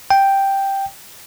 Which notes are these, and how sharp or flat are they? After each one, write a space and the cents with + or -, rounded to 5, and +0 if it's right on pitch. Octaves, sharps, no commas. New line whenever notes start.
G5 +0